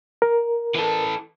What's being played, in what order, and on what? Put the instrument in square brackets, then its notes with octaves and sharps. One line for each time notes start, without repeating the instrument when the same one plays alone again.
[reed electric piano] A#4
[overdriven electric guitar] E3 A4